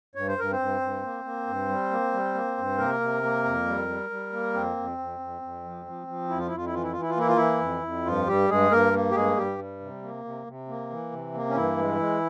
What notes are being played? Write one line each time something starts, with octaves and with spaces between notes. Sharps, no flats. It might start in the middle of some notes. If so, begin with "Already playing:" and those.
G2 C#5
C5
G2 A#4
C4 C5
G2
G2
A#3
A#3
G2
G3
A#3
G3
A#3
G2
C3 A#3 A#4
C3
A#3
F2
G3
G3
G3
A#3
F2 C4
F2
F2
F2
F2
F3
F3
F3
F2 E4
F4
E4
F2 F4
E4
E3 F4
E4
E3 F4
E4
F4
A#3 E4
F4
E3 E4
F2
F2
G2 F3 F4
G2 G3 G4
G2 G#3 G#4
G2 A#3 A#4
A#3
G4
G2 G#3 G#4
G2 G3 G4
G3
C3
A#3
C3
C3
A#3
E3
C3
A#3
C#4
G2 E3 E4
G#3
G#3